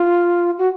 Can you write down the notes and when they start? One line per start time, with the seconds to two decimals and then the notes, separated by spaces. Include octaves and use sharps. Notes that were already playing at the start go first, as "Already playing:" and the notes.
Already playing: F4
0.58 F#4